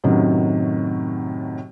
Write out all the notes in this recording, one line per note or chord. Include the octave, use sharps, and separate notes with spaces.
F#2 A2 C3 D#3 F#3